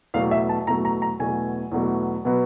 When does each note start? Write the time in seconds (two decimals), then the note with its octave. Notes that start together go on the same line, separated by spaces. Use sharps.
0.14 E2 B2 F#3 A3 F5
0.31 E5
0.49 A5
0.67 E2 B2 F#3 A3 A#5
0.85 A#5
1.02 A#5
1.19 E2 B2 F#3 A3 G#5
1.72 E2 B2 F#3 A3
2.25 B2 F#3 B3